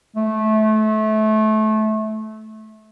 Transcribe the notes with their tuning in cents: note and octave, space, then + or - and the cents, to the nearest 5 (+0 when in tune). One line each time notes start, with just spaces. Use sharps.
A3 -25